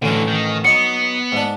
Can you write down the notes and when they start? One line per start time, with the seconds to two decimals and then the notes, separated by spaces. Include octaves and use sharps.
0.02 A1 D3 F#3 C#4
0.28 D#3
0.65 F#3 B3 D#4 C#7
1.32 G#2 D4